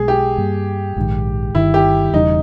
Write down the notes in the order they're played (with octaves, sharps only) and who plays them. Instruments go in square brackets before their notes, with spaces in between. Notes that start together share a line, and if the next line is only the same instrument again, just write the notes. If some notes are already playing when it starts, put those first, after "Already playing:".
Already playing: [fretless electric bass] B1 B2 G#3 [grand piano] G#4
[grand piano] G4
[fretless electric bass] G2 G3 A#3
A#1 G#2 D#3
[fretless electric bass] G1 G2 D#3 [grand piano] E4
[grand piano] G4
[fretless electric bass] E1 E2 C#3 G3 [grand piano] D#4